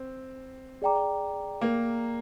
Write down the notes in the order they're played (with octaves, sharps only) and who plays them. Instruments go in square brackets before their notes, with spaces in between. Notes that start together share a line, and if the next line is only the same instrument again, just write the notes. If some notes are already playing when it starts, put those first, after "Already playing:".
Already playing: [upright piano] C4
[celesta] G#4 D5 G5 A#5 D6
[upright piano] A#3